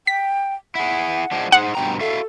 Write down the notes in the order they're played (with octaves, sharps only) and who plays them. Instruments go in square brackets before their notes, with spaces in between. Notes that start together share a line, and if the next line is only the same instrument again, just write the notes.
[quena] G5 [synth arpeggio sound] B6
[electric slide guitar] E4 G#4 [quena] F#5
[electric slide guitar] F3 G#3 D4
[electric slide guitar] D#4 G#4 C5 [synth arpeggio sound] F#5
[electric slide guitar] G2 B2 A#5 [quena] G5
[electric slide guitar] F#4 E5 F5 [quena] A4